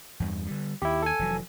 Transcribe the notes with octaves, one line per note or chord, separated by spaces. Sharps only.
E2 G2
D3 G3
D#2 E4 G4
A4 G#5
F1 E3 F#3